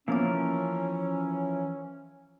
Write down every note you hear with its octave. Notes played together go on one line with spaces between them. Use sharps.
E3 F3 A#3 B3 C#4 A#4 D6